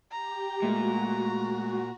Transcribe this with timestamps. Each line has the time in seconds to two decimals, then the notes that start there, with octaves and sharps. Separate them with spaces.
0.12 G4 A#5
0.62 A#2 G#3 A3 F#4